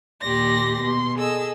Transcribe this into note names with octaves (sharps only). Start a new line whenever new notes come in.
D#2 A#2 G4 D5 C6 A#6
B2 C6
G#4 A4 D#5 E6